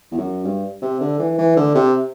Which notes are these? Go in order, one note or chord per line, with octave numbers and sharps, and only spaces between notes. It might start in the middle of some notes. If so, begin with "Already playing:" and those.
E2
F#2
G2
C3
D3
E3
E3
D3
C3